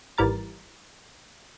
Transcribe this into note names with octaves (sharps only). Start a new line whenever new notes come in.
G#1 E3 G3 A#4 A6